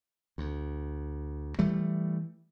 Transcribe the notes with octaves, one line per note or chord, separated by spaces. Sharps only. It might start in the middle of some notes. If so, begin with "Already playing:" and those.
D2
E3 G3 A3